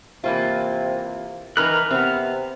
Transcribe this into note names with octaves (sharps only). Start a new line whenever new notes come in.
C3 E3 A#3 F4
D#3 E3 A#4 B4 F6 F#6
C3 B3 C4